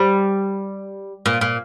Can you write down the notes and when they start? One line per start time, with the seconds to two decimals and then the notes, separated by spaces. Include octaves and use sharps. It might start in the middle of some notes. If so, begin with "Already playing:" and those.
Already playing: G3
1.26 A#2
1.41 A#2